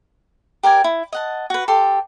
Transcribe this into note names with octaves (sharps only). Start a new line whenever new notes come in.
G4 A#4 D5 G#5
E4
D#5 F#5 A5
F#4 B4
G4 A4 A5 C6